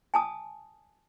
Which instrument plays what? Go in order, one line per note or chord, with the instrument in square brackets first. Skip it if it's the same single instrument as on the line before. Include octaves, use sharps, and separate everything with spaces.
[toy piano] G#5 A5 D#6